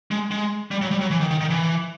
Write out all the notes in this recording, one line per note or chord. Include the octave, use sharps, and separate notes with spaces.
G#3
G#3
G3
F#3
G3
F#3
E3
D#3
D#3
D#3
E3